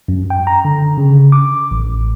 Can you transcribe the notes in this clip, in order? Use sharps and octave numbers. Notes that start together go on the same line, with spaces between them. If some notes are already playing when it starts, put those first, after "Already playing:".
F#2
G5
A#5
D3
C#3
D6
A1